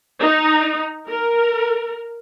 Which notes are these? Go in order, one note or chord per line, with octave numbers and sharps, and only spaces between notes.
D#4
A#4